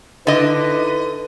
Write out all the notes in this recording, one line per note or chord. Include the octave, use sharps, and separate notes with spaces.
D3 D#4 E4 B4 D#5